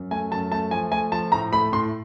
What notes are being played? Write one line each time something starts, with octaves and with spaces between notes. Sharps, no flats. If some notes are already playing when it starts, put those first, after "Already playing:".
Already playing: F#2
A3 G#5
F#2 A5
A3 A5
F3 G#5
A3 G#5
F3 A5
A2 A#5
A3 B5
A2 C6